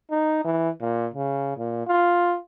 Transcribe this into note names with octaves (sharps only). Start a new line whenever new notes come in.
D#4
E3
A#2
C#3
A#2
F4